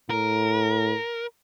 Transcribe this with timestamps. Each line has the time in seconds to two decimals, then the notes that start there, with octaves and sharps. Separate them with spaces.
0.10 A2 A#4